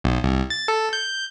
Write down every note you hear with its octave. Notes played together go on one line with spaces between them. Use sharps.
B1
C2
A6
A4
G6